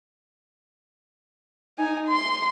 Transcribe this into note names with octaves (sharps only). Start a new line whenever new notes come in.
D#4 G#5
C6